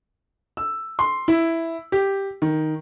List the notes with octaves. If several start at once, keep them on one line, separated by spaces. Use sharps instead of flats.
E6
C6
E4
G4
D#3